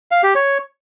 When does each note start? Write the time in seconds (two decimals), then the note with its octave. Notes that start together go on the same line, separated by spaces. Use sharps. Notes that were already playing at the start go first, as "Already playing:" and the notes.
0.11 F5
0.23 G4
0.35 C#5